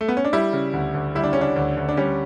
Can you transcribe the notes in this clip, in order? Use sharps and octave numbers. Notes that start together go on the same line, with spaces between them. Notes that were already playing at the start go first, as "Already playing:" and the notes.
A3
B3
C#4
D4
G3 E4
C#3
D2
D2
G3 E4
D4
C#3 C#4
D4
D2
D2
D4
G3 C#4